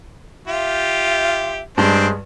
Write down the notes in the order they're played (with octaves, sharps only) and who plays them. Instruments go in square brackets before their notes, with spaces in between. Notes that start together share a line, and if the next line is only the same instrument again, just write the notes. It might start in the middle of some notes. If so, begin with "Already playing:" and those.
[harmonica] F4 G4 [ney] E5
[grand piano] G2 [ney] G#3 [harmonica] C4 D4 C5